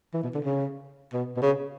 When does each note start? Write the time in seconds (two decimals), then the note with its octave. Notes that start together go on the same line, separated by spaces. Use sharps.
0.14 E3
0.24 B2
0.34 D3
0.44 C#3
1.13 B2
1.36 B2
1.42 C#3